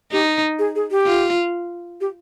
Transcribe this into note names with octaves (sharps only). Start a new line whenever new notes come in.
D#4 G4
G#4
G#4
G4
F4
G4